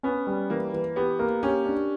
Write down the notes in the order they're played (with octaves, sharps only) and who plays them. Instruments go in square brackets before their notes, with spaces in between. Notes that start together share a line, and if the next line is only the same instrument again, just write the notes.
[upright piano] B3 [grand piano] C#4
[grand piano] G3
[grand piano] E3 [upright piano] A#3
[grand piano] E3
[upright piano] B3 [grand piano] G4
[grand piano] A#3
[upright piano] C#4 [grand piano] G4
[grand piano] D4